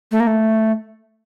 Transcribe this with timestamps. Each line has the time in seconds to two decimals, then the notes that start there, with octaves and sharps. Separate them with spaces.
0.11 A3
0.20 A#3
0.27 A3